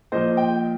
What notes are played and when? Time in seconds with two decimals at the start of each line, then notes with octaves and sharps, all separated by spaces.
0.12 A#2 F3 C5 D#5
0.37 D#5 G5